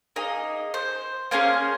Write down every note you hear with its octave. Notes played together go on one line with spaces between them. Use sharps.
A#3 D#4 G#4 D#5
C5
A#3 C#4 G#4 C5